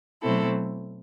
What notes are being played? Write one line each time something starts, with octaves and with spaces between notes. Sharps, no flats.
B2 F#3 A3 C4 E4 A4